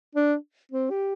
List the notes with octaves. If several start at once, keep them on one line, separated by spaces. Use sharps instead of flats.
D4
C4
G4